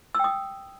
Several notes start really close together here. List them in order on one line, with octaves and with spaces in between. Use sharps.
E6 G5 D#6